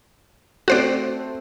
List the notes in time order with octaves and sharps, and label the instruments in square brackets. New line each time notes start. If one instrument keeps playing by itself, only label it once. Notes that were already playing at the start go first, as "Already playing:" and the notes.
[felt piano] A3 C4 [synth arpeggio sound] F#4 C5 D5